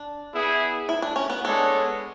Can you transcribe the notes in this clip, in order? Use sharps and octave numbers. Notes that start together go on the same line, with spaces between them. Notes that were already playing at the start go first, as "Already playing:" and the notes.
Already playing: D4
B3 E4 G#4
E4
D4
C#4
B3
G#3 B3 D4 A4 C#5